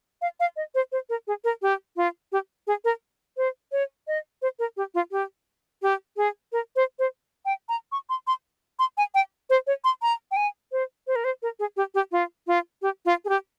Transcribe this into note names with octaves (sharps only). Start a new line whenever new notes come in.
F5
F5
D#5
C5
C5
A#4
G#4
A#4
G4
F4
G4
G#4
A#4
C5
C#5
D#5
C5
A#4
G4
F4
G4
G4
G#4
A#4
C5
C5
G5
A#5
C#6
C6
C6
C6
G#5
G5
C5
C#5
C6
A#5
G5
G#5
C5
C5
A#4
C5
A#4
G#4
G4
G4
F4
F4
G4
F4
G#4
G4